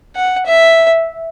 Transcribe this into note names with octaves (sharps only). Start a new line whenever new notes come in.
F#5
E5